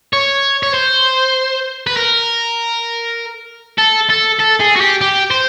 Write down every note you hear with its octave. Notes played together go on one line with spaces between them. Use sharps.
C#5
C#5
C5
B4
A#4
A4
A4
A4
G#4
F#4
G4
G4
C5